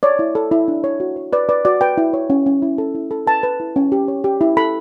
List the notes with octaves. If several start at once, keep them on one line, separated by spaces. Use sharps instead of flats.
C#5 D5
E4
A4
E4
D4
C#5
F#4
C#5
B4 D5
B4 D5
F#4 D5
B4 G5
E4
C#5
C#4
C#4
E4
A4
E4
A4
B4 A5
B4
E4
C#4
G4
C#5
G4
E4
A4 B5